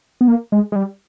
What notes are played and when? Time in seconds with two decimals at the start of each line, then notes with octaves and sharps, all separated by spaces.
0.21 B3
0.28 A#3
0.52 G#3
0.72 G#3
0.76 G3